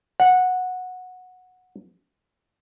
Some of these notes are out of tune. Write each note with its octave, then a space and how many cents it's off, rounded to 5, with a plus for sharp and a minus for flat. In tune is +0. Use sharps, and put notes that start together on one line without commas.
F#5 -10